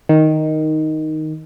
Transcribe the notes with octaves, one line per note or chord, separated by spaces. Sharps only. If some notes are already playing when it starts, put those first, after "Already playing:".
D#3